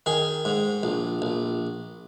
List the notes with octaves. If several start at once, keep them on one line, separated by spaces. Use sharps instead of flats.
D#3 G#4
G#2
A#1
A#1